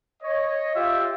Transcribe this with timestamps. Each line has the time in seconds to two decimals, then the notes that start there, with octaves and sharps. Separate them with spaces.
0.23 C#5 D#5
0.75 F4 G4 E5 G5